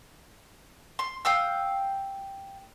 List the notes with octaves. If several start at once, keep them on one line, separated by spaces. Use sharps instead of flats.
C6
F5 G5 D#6 E6